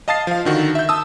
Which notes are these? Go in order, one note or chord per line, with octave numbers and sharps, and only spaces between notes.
D#5 F5 A5 D#6 A6 C7
F3 F5
D3 D#3 F#4
E5 G6
A5 D#6 E6